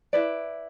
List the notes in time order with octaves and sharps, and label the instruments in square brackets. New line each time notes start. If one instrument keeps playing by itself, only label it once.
[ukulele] E4 B4 D5